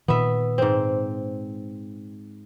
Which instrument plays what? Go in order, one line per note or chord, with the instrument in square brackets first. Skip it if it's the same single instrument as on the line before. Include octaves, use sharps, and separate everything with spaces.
[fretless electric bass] A#2 D#3 [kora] B3 E5
[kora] G#2 C4